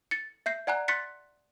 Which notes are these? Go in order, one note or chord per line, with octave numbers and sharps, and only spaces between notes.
A6 C#7
E5 G6 C7
D5 F#5 G#5 A#5 F#6
C6 F#6 A6 B6 C#7